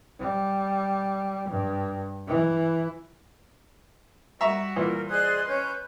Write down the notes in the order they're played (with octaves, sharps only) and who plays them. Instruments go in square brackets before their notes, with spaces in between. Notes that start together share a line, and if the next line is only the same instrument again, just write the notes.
[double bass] G3
G2
E3
[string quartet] G3 F#4 [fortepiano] E5 A#5 C#6
[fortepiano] A#2 E3 [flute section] A#4
[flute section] G#4 D5 F#6 [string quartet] C5 D#5 C6
[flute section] C#4 F#6 G6 [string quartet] B4